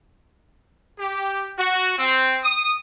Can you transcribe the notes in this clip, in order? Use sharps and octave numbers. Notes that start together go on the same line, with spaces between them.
G4
F#4
C4
D#6